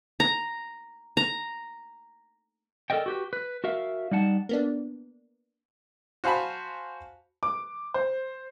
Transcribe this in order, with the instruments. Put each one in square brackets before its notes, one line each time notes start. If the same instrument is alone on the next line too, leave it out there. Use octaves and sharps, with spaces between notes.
[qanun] A#5
A#5
[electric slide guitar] A4 A#4 D5 D#5 G5
F#4 G4 B4
B4
F#4 A#4 E5 F5
G3 D#4 F#5 A5
[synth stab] A#3 B3 D4
[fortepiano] F#4 C5 F5 G#5 A5 B5
[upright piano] D6
C5